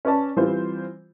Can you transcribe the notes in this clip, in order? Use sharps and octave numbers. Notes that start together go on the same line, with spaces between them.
C#4 B4 D5 A5
E3 G3 C4 F4 C5